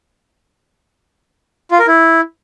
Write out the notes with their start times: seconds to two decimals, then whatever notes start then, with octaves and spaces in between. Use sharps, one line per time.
1.71 F4
1.79 A#4
1.87 E4